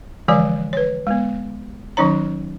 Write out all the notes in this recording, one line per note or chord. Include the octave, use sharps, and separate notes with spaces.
D3 E3 F3 G#3 D5 G#5
B4 C#5
G#3 B3
D#3 F#3 C#4 D#4 C#5 A#5